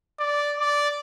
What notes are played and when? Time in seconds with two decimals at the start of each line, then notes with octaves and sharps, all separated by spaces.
0.19 D5
0.59 D5